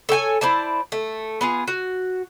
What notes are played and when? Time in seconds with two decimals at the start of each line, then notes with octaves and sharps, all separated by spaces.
0.09 A4 C#5 G5 G#5
0.41 E4 C5 D5 A5
0.92 A3
1.41 B3 F4 G#4
1.67 F#4